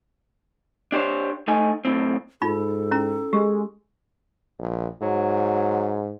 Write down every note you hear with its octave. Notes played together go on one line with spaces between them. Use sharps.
D4 G4 C5 C#5
A3 D#4 G#5
B1 F2 A2 C4
G#2 D#4 F4 A4 B5
C#4 E4 A#5
G#3 G4
A#1
G#2 F#3